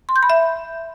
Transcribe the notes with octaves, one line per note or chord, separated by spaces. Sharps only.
C6
G6
B5
E5